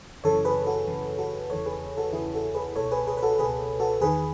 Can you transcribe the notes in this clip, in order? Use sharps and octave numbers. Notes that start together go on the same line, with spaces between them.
F#2 C#3 E3 A4 C#5
G#4 B4
F#4 A4
F#2 C#3 E3
F#4 A4
E2 C#3 E3 A4 C#5
G#4 B4
F#4 A4
E2 C#3 E3 E4 G#4
F#4 A4
G#4 B4
C#2 B2 A4 C#5
G#4 B4
G#4 B4
B4
F#4 A4
C#2 B2 G#4 B4
F#4 A4
E2 D#3 G#4 B4